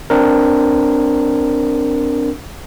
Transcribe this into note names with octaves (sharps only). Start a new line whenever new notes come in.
C4 D4 A#4